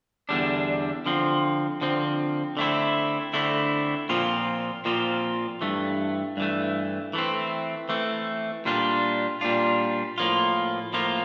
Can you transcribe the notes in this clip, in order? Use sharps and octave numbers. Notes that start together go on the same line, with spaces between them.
E2 D3 G3 D4
D3 F3 C4
D3 F3 C4
D3 A3 C4 E4
D3 A3 C4 E4
A#2 F3 C4 F4
A#2 F3 C4 F4
G2 E3 A3
G2 E3 A3
E3 A3 C4
E3 A3 C4
A#2 G3 D4 F4
A#2 G3 D4 F4
A2 F3 A#3 F4
A2 F3 A#3 F4